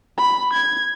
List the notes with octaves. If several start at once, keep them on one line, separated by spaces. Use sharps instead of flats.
B5
G#6